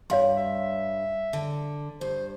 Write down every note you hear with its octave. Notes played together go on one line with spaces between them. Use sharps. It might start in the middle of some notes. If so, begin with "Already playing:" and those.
G2 C#5 F5 C6
E5
D3
G2 C5